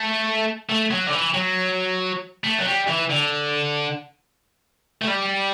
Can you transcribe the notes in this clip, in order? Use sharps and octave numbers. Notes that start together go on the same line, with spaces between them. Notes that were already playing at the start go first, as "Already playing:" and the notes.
Already playing: A3
A3
F#3
D3
E3
F#3
A3
F#3
G3
E3
D3
A3
G3